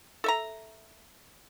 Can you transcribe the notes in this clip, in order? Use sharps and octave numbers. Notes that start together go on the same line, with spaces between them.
A4 E5 A#5